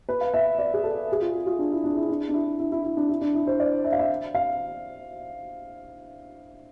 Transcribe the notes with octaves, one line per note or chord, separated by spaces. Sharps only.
B4
F5
E5
D5
G#4
A4
G#4
F4
F4
D4
E4
D4
E4
D4
D4
E4
E4
E4
E4
D4
E4
D4
E4
C5
D5
E5
F5
E5
F5